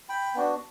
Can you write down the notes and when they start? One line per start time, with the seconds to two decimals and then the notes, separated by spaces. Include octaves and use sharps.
0.09 G5 B5
0.34 B3 D4 F#4